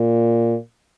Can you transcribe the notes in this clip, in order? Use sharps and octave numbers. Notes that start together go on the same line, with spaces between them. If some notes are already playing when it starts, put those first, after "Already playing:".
Already playing: A#2